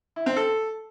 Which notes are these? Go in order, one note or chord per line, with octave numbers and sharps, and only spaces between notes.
E4
C4
A4